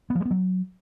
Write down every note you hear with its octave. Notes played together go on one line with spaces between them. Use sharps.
B3
F3
G#3
B3
F#3